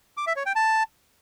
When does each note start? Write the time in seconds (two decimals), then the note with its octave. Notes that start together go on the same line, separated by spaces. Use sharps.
0.17 D6
0.27 E5
0.36 C#5
0.46 G5
0.56 A5